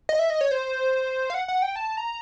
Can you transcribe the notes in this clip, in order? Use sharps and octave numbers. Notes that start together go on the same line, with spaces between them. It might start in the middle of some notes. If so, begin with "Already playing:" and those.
D#5
E5
D#5
C#5
C5
F5
F#5
F#5
G5
A5
A#5